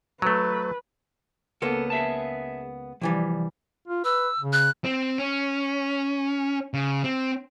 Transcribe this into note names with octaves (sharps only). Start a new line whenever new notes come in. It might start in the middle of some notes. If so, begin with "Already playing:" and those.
F#3 A3 B4
C#2 A#3 B3 A4
G#4 E5 A5
C2 E3 F3 G3
F4
B4 E6
C#3
F#6
C4
C#4
C#3
C4